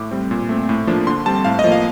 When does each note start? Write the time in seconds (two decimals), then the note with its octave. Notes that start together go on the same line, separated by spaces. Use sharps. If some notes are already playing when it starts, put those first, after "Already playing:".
Already playing: A2 D6
0.11 G3 C4
0.31 A#2
0.49 A3 C4
0.69 A2
0.87 F3 A#3 D4
1.07 D3 C6
1.26 G3 C4 A5
1.44 A2 F5
1.59 D#5
1.64 F3 A#3
1.72 F5